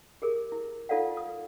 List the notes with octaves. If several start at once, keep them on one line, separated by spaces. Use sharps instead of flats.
G4 G#4 A#4
E4
D#4 F4 A4 D5 F5 F#5
D#6